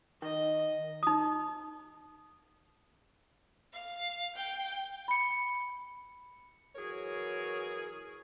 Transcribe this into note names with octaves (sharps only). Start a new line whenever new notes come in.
D#3 D#5
D#4 D#6
F5
G5
B5 C#7
E3 F#3 G#4 A#4 C#5